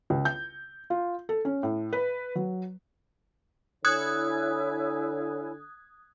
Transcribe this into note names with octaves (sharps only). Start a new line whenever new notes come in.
C#2
G6
F4
A4
C#4
A2
B4
F#3
D3 E4 C#5 G#5 D#6 F#6 G#6